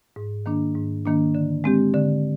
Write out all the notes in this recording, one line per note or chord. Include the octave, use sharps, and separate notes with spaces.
G#2
D#3 A#3 D4
G#2
D#3 A#3 D4
D3
G#3 C4 G4
D3